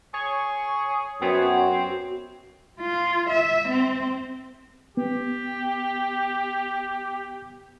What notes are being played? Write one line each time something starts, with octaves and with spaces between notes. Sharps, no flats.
G#4 C#5 C#6
F#2 B3 C4 F#4 C#5
F4
E5
C4
B3 G4